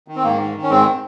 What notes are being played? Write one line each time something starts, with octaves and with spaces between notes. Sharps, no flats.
D#3
C4
G#2 A#3
D#3
D#3
C#4
G#2 G#3 C4